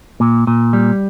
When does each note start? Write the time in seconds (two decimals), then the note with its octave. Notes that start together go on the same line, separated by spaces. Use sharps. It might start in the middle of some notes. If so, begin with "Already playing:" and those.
0.20 A#2
0.47 A#2
0.73 G3